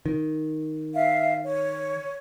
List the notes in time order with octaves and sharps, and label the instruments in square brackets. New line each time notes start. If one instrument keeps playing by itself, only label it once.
[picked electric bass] D#3
[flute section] E5 F5
C#5